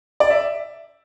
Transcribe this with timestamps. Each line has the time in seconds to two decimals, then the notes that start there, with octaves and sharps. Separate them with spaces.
0.20 D5
0.30 E5